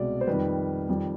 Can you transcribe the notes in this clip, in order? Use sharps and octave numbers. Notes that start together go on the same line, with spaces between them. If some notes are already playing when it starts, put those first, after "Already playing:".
Already playing: C2 B2 G#3 D5
C5
F2 D#3 G3 B4
F2 D#3 G3